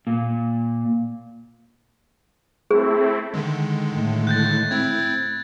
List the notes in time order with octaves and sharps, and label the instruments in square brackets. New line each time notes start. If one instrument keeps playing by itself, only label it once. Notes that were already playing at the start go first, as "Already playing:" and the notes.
[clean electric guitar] A#2
[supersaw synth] A3 C4 E4 [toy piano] G#4
[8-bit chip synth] D3 D#3 G#3
[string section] A2
[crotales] F#6 G6 A6
[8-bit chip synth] C4 E4 [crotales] G#6